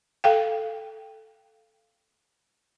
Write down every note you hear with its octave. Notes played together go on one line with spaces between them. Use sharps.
A4 F5 G5